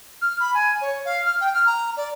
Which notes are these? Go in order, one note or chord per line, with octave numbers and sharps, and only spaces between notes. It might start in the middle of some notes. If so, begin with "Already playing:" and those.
F6
B5
G#5
C#5
F5
F6
G5
F6
A#5
D5